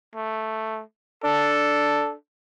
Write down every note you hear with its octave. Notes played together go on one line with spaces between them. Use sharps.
A3
D4 A4